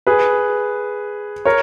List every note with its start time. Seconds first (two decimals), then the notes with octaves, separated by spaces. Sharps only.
0.07 G#4 B4
1.45 A#4 C#5